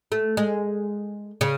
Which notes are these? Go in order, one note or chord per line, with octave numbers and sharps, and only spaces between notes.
A3
G#3
C#3